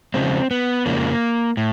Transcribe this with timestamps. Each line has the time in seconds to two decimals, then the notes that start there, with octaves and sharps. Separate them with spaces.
0.14 E2 C#3 F3 G#3 C4
0.51 B3
0.86 F2 C#3 F3 G#3 A#3
1.57 A2